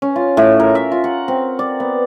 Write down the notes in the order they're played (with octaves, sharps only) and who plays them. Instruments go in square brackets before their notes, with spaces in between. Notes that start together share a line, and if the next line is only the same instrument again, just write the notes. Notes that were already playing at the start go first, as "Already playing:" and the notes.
[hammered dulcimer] C#4
F4
A2
A#4
E5
F4
F#5
C4
D5
B3